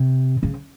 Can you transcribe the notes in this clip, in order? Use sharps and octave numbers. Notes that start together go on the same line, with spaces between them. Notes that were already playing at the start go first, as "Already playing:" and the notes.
Already playing: C3
C#3